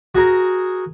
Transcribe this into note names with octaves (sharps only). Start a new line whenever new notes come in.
F#4 G#4 A#4